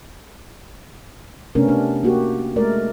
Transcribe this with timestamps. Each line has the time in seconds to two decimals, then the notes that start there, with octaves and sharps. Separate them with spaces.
1.55 C3 A3 B3 C#4 D4 A#4
1.69 D4
2.03 A#3 F#4 G4
2.56 G#3 A3 A#4 D5